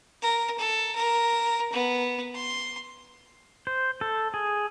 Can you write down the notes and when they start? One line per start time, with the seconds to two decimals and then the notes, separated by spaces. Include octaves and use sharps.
0.22 A#4
0.59 A4
0.95 A#4
1.72 B3
2.35 C6
3.67 C5
4.01 A4
4.34 G#4